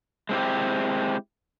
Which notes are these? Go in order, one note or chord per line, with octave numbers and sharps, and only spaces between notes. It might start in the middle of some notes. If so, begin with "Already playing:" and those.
G#3 C4 E4 G4